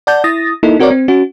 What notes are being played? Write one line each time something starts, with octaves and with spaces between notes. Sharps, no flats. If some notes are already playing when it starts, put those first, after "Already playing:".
D5 F#5 A5 G6
E4 D#6 A6 A#6
A#3 D#4 E4 A4
C4 F#4 A#4 C#5 D5
C4
C#4 F#4